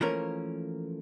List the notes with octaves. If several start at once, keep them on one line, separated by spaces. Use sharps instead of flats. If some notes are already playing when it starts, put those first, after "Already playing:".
E3 F3 A3 A#3 C#4 A#4